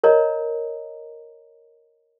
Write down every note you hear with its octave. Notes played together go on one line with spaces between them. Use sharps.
A#4 C#5 D#5 A#5